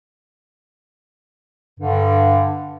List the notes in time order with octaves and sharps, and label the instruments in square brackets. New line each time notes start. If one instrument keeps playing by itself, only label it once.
[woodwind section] G2 D3